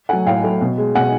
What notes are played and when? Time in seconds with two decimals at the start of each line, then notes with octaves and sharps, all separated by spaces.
0.09 F#3 A3 F#5 G#5
0.26 A2 F5 G5
0.44 F#3 A3
0.61 B2
0.78 G#3
0.95 B2 F#5 G#5